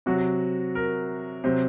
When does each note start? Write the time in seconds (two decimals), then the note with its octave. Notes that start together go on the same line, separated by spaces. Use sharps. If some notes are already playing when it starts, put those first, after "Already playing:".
0.06 C3 F#3 F#4
0.75 A#4
1.44 C3 F#3 C5